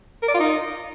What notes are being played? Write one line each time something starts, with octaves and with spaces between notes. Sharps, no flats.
A#4
D5
F4
D#4